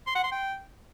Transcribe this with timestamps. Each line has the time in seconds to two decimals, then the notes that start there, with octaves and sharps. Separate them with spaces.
0.07 C6
0.15 F#5
0.24 C6
0.32 G5